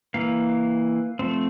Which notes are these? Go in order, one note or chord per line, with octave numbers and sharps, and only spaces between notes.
E3 A#3 F5
F3 A3 C4